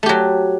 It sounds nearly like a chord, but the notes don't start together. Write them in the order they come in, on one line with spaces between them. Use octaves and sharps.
A3 G4 F#3